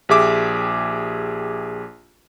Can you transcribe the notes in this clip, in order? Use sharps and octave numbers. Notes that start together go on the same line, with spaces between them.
A#1 G4 G#4 E5 D6